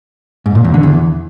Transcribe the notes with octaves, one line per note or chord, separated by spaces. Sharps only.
G#2
A#2
E2
D3
E2